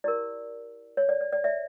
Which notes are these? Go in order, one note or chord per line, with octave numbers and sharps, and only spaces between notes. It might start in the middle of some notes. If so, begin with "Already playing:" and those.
E4 G4 A#4 D5
C#5
D5
D5
D5
D5 E5